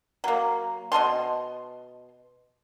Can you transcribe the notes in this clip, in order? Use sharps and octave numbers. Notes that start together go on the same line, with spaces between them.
F#3 A#3
B2 D#5 A5 C6